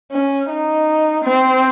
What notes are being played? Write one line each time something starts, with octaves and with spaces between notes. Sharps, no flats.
C#4
D#4
C4